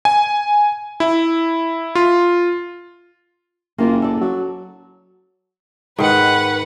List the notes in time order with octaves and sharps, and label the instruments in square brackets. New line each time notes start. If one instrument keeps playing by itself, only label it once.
[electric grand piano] G#5
E4
F4
[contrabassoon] F#1 [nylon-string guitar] A#3 F4
[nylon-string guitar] A4 D5
[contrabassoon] F#3
[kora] G#2 D#3 [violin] B4 F#5